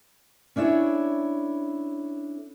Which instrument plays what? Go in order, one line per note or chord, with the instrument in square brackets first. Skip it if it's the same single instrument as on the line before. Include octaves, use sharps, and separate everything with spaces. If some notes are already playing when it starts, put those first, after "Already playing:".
[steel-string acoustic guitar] C#4 D4 E4 A4 C#5